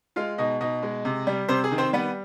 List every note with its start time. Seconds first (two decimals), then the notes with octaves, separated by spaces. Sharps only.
0.16 G#3 F4 F5
0.38 B2 D#4 D#5
0.61 B2 D#4 D#5
0.83 G#3
1.05 C3
1.27 G3
1.49 C3 C4 C5
1.64 G#4
1.71 D#3
1.78 C4 C5
1.93 G3 B3 B4